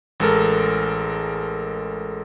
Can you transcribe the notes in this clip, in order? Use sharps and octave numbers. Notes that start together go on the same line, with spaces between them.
A1 G#3 A4 A#4